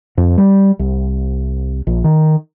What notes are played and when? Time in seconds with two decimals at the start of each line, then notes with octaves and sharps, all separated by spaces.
0.17 F2
0.38 G3
0.79 C2
1.87 A#1
2.04 D#3